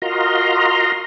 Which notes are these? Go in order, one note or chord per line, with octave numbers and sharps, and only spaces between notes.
F4 F#4 A#4 D#5 A#5 C6